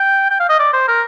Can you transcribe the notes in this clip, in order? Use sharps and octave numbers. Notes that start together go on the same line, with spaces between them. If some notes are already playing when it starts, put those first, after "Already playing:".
Already playing: G5
G5
F5
D#5
D5
C5
A#4